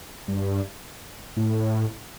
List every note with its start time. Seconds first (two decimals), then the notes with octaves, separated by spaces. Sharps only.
0.28 G2
1.37 A2